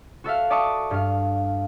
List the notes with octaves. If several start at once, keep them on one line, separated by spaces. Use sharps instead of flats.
F#4 A4 E5 F5
D5 E5 A5 C#6 D#6
G2 F5